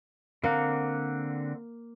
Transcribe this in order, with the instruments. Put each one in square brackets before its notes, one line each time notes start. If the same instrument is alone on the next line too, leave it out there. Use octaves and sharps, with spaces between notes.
[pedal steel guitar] D3 C4 F#5 [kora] A#3